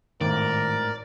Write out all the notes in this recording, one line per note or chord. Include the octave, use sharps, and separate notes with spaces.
G#1 A2 D#3 A#4 D5